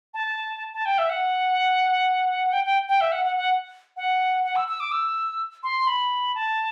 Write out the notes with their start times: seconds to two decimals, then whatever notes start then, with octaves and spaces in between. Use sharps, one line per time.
0.14 A5
0.74 A5
0.85 G5
0.98 E5
1.09 F#5
2.53 G5
2.65 G5
2.89 G5
3.01 E5
3.12 F#5
3.24 F#5
3.37 F#5
3.97 F#5
4.44 F#5
4.56 E6
4.68 E6
4.80 D6
4.92 E6
5.63 C6
5.87 B5
6.35 A5